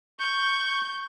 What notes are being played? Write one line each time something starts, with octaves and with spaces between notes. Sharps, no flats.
C#6 G6